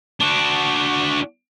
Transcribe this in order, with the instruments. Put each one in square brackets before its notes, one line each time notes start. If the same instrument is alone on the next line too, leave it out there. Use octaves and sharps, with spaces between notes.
[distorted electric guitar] D4 F#4